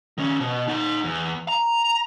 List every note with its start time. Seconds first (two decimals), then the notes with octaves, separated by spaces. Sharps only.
0.18 D#3 C#4
0.40 B2
0.68 D#4 F#5
1.04 E2
1.48 A#5